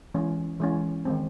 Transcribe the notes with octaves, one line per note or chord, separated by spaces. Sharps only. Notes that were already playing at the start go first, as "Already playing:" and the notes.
E3 G#3 C#4
E3 G#3 C#4
D#3 G#3 C4